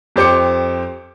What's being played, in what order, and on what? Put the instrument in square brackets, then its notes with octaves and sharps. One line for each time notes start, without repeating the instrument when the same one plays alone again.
[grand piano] F2 G4 C5 D6 C#7